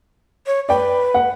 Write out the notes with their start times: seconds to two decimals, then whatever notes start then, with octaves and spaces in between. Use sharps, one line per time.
0.46 C#5
0.69 B4 D5 G5
1.14 F#5